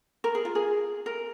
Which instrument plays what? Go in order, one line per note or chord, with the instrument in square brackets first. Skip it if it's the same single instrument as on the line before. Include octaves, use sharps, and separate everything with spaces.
[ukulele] A#4
G#4
F4
G#4
A#4